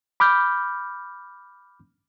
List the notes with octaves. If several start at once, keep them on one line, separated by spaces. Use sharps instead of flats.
B5 D6 F6 G6